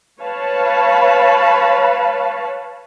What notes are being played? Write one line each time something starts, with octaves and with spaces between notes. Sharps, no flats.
B4 C#5 F5 A5 B5